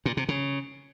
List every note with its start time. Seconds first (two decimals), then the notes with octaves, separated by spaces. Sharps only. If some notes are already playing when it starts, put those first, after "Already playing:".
0.06 A#2
0.17 C3
0.29 C#3